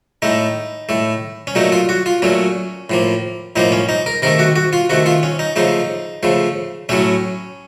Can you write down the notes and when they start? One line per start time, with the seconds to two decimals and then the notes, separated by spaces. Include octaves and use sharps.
0.22 A2 A3 D#4
0.89 A2 A3
1.47 C#4
1.55 A#2 F#3 A3 D#4
1.72 F4
1.89 F#4
2.06 F4
2.22 A#2 F#3 A3 C#4
2.90 A2 F3 A#3
3.56 A2 F3 A#3 D#4
3.72 C#4
3.89 D#4
4.06 A#4
4.22 C3 D#3 A3 A#4
4.39 F#4
4.56 F#4
4.73 F4
4.90 C3 D#3 A3 F#4
5.06 F4
5.23 C#4
5.39 D#4
5.56 C#3 F3 A3 D#4
6.23 C#3 F3 A3
6.89 A2 F#3 A3 C#4